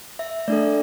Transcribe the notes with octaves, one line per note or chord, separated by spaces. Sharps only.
E5
A3 D4 A4 D5